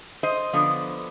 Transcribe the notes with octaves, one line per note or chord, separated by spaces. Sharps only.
C5 D#5
D3 F3 B3